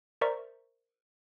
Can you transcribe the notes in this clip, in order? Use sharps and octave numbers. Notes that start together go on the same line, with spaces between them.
A#4 C5 D5 E5 A#5 C#6